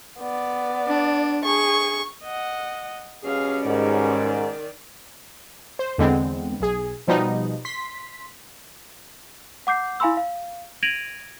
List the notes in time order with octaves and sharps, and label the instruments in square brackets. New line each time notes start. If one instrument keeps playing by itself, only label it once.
[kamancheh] B3 D5
[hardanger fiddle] D4
[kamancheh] G#4 [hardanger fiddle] C#6
[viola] D#5 F#5
[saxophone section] B2 G3 C#4 [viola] G#4 F5
[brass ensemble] G#2 [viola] D#3 D5
[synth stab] C5
E2 D3 G#3 B3 C4
B1 G#4
B2 F3 G3 B3 D#4
C6 B6
[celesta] F#5 D6 G6 C7
E4 F5 G#5 B5 C6 E6
F5
G#6 A#6 D7 D#7 F7 F#7